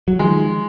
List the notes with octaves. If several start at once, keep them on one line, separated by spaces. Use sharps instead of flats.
F#3
D#3 F3 G#3